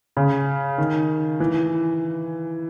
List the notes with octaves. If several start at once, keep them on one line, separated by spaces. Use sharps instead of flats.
C#3
D#3
E3